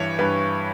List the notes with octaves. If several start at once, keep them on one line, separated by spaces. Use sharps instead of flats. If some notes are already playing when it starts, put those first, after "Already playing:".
Already playing: G2 E3 C#5
G2 B4